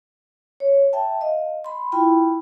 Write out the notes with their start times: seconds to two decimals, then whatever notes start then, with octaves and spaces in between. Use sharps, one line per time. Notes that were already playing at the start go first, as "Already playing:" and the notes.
0.60 C#5
0.93 E5 G5 A5
1.21 D#5 F5
1.64 B5 C6
1.92 E4 F4 G5 B5